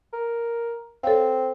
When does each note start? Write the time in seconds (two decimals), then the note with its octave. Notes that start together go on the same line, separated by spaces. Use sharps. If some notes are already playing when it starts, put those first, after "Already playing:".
0.13 A#4
1.04 C4 A4 C#5 F5